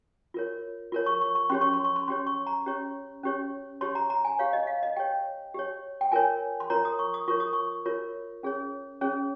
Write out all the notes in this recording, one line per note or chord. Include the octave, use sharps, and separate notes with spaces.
F4 A#4 C#5
F4 A#4 C#5
C#6
C#6
C#6
C#4 G4 C#5 C6
C#6
C6
C#6
C6
C#4 G4 C#5 C6
C#6
A#5
C#4 G4 C#5
C#4 G4 C#5
G4 C#5 C6
A#5
A#5
G#5
G4 C#5 F5
D#5
F5
D#5
G4 C#5 G5
G4 C#5
G5
F4 A#4 C#5 G#5
C6
F4 A#4 C#5 A#5
D#6
C#6
D#6
F4 A#4 C#5 C#6
D#6
C#6
F4 A#4 C#5
C#4 G#4 C#5
C#4 G#4 C#5